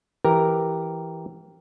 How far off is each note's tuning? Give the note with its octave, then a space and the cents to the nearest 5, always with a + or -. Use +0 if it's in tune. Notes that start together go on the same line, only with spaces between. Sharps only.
E3 +0 G4 +0 A#4 +0